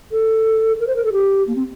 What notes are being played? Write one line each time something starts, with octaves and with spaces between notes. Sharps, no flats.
A4
A#4
C5
A#4
A4
G4
A#3
C4